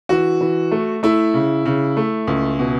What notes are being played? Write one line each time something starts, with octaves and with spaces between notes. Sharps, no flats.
E3 F#4
E3
A3
A3 E4
C#3
C#3
A3
C#2
B2